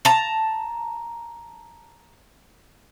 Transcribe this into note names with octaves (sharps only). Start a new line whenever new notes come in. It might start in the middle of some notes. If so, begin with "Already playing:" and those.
A5 A#5